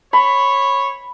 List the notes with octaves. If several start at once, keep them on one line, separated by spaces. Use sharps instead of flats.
C#5 B5